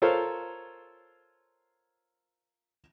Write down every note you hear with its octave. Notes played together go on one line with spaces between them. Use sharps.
F4 A4 A#4 C5 C#5 F5